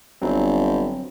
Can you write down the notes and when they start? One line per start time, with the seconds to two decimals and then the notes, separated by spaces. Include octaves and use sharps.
0.22 G1 F#3 C4